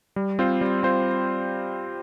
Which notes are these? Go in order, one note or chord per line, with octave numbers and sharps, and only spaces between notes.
G3
C4 F4 C5
G3
C4 F4 C5